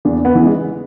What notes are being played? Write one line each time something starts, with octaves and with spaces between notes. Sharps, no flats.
E2 D4
B3
C#3 E3
G#3